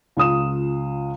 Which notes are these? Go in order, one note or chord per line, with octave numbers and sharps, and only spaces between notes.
C#2 F4 D#6 E7